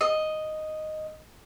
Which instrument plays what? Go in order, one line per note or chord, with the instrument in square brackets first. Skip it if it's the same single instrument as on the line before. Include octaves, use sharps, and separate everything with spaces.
[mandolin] D#5